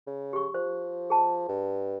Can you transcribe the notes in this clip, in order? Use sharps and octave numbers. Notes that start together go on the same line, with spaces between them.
C#3
G4 C#6
F3 C5
G#4 A5
G2